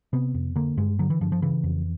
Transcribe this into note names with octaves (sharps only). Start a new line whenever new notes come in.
C3 B3
F2
D3 A#3
G2 G#3
D3 F#3
E3
G2 F3
F3
C#3 E3
F2